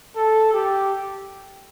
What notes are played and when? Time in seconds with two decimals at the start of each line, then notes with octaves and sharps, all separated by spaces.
0.16 A4
0.54 G4